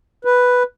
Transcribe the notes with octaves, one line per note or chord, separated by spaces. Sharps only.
B4